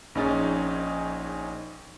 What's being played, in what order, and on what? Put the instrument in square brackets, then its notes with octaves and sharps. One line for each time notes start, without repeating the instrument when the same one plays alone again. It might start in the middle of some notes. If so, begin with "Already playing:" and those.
[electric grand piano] A#1 C#4 D#4 G#4 A6